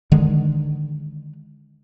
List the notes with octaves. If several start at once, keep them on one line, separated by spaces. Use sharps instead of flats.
D3 D#3 G#3